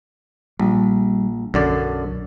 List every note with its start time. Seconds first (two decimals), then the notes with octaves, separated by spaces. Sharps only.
0.60 A#1 G3
1.54 B1 F#2 D3 D5